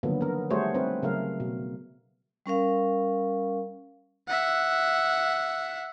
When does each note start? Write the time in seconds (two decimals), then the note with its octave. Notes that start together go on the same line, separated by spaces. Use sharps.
0.03 D3 D#3 F3 F#3 A#3 B3
0.21 B3 A#4
0.50 G3 A3 F#4 G#4 C5 C#5
0.74 C4 D#4 B4
1.02 C#3 F#3 A3 A#4 F5
1.40 B2
2.46 G3 C#4 A#4 F5
4.28 E5 F#5